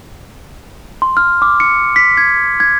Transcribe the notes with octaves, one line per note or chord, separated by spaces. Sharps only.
C6
F6
D6
C#7
B6
G#6
G#6